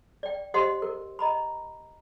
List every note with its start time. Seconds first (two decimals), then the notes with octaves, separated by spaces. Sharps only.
0.23 D5 G5
0.54 G4 C5 D#5 F#5 C6
0.82 A#4
1.19 D#5 A#5 B5